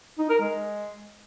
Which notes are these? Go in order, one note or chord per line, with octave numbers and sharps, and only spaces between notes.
D#4
A#4
G#3